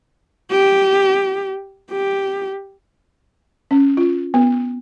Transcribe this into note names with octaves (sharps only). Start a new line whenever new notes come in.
G4
G4
C#4
F4
B3